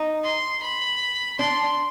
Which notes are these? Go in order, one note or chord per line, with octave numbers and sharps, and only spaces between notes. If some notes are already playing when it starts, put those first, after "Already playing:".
Already playing: D#4
C6
B5
D4 C6